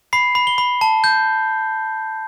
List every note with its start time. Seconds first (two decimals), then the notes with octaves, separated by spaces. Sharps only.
0.13 B5 C7
0.35 B5
0.47 G7
0.58 B5
0.81 A5
1.04 G6